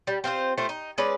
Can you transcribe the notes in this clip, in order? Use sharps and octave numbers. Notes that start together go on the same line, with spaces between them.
G3
C4 F4 A4 C5
A3 F4 C5
D#4
G#3 C#4 B4 D5